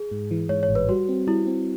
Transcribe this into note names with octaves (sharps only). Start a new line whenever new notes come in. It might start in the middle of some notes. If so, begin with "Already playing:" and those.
Already playing: G#4
G#2
E3
G#2 C#5
C#5
A1
B4
G3 F#4
C4
G3 E4
C4